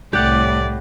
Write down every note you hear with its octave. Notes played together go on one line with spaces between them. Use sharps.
C2 A2 G4 D5 F#5